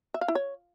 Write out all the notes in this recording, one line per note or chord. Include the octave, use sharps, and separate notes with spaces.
E5
F5
E4
C#5